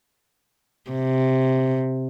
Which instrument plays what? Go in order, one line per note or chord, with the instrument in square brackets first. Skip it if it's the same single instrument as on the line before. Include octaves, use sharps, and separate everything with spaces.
[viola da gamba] C3